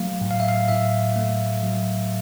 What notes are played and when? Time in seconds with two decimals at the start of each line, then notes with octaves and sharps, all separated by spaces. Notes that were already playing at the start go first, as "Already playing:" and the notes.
Already playing: F#3 A3 F5
0.21 A2
0.31 F5
0.40 E5
0.49 F5
0.68 A2 E5
1.16 A3
1.63 F#3